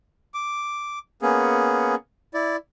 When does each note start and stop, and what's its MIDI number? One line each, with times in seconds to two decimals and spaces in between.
0.34 0.99 86
1.22 1.95 58
1.22 1.95 59
1.22 1.95 61
1.22 1.95 68
2.34 2.56 64
2.34 2.56 74